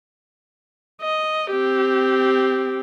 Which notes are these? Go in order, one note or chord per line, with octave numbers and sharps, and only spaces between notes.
D#5
C4 G4